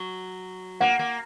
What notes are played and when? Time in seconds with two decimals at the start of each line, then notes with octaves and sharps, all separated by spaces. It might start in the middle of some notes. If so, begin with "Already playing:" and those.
Already playing: F#3
0.80 A#3 F#5
0.99 A#3